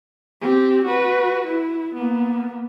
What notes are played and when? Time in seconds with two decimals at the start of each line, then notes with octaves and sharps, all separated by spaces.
0.41 C4 G4
0.85 F#4 B4
1.47 E4
1.95 A#3 B3